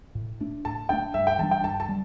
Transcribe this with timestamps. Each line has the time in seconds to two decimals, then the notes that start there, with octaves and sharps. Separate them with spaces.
0.15 A2
0.40 A3 D4
0.65 A2 A5
0.89 A3 D4 G5
1.14 G2 E5
1.27 G5
1.39 E3 G3 D4 A5
1.51 G5
1.64 G2 A5
1.80 A5
1.89 G3